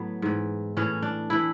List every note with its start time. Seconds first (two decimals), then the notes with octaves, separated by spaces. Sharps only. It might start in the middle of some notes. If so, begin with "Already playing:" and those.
Already playing: A2 F#3 B3
0.22 G#2 E3
0.77 A2 E3 C#4
1.02 D4
1.30 E3 E4